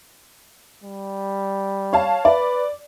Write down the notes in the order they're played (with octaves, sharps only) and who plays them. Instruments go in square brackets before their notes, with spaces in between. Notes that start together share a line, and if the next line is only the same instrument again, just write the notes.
[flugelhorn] G3
[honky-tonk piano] C#5 F5 A5
[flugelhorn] B4 [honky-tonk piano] D5